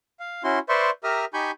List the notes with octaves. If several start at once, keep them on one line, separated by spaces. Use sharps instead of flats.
F5
C#4 E4 F#4 C6
B4 C5 D5 E5 C6 C#6
G4 A#4 E5 A#5 D#6 F6
D#4 G4 G#5 B5 C#6 G6